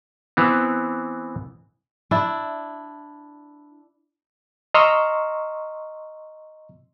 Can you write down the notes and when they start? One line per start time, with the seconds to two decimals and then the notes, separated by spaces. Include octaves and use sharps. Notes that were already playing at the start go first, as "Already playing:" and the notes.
0.37 E3 B3 C4
2.11 D4 E4
4.74 D#5 A#5 C6 C#6 E6 F6